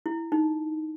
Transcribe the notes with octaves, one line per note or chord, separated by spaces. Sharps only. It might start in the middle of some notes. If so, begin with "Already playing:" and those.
E4
D#4